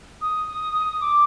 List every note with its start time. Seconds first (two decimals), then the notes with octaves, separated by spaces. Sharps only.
0.22 D#6
1.01 D6